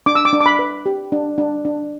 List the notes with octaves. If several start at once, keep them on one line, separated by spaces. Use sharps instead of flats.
D4 D6
E6
D6
D4
D6
B5
B4
G4
D4
D4
D4